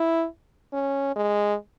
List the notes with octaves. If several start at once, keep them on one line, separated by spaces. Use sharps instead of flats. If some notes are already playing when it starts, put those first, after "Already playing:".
Already playing: E4
C#4
G#3